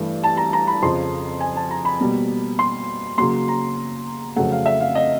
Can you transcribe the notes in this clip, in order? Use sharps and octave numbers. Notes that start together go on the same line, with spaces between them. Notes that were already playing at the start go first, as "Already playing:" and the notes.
Already playing: G2 E3 A3
A5
A#5
A#5
B5
F2 C#3 F3 C6
G#5
A5
A#5
B5
B2 G3 A#3
C6
C#3 F#3 A#3 C6
A#5
F2 C#3 F#3 A3 F#5
F5
E5
F5
D#5